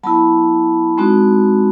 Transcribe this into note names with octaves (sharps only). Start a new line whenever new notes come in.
F#3 B3 E4 A5 B5
G#3 C4 D#4 F#4